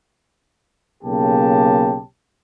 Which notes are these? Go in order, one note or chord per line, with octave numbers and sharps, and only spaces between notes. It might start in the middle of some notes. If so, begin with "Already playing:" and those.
B1 C#3 A#3 G4 A5